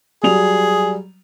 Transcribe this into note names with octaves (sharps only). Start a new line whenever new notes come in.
F#3 G3 G#4 F7